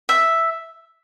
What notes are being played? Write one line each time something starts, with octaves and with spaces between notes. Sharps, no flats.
E5